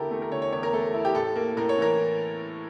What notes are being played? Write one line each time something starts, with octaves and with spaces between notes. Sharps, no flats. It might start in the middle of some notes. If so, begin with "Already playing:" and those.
Already playing: E2 D3 E4 G4 A4 A#4
A3
A#4
D3 C#5
C#5
E2 C#5
A#4
A3 A4
E4
G4
A2 A4
A#3
A2 A#4
C#5
E3 A#4